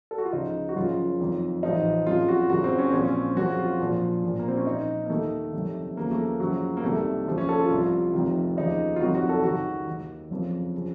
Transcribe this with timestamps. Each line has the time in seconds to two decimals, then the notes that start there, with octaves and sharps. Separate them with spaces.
0.11 A4
0.18 F#4
0.26 F4
0.33 C#2 C#3 F3 D#4
0.69 F#4
0.76 F#1 F#2 C#3 F3 F4
1.20 F#1 F2 D#3
1.63 A1 A2 F3 D#4
2.06 F#1 F2 C#3 F4
2.28 F#4
2.50 F#1 F#2 C#3 F#4
2.64 C4
2.79 C#4
2.91 A#1 A#2 F3 C4
3.04 C#4
3.36 F#1 F2 C#3 F3 F#4
3.59 F4
3.80 A#1 A#2 F3
4.24 A#1 A#2 F3
4.39 A#3
4.48 C4
4.58 C#4
4.67 A#1 A#2 F3 D#4
5.06 A#3
5.10 D#2 D#3 A3
5.53 F#1 F2 C3 D#3
5.97 D#2 C#3 F3 A#3
6.11 A3
6.26 A#3
6.40 F#1 F#2 C#3 F3 F#3
6.77 A#3
6.84 C2 C3 D#3 A3
7.27 D#2 C#3 F3
7.38 C#4
7.49 A4
7.59 F4
7.70 C2 C3 F3
8.13 F1 F2 C3 D#3
8.57 D#2 C#3 F3 D#4
8.96 F4
9.00 F#1 F2 C3 D#3 F#4
9.15 F#4
9.29 A4
9.44 C#2 C3 D#3 F#4
9.87 D#2 D#3
10.31 F#1 F2 C#3 F3
10.77 C#3 F3